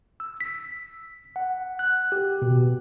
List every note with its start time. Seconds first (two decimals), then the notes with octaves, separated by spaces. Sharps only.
0.20 E6
0.41 B6
1.36 F#5
1.79 F#6
2.12 G4
2.42 B2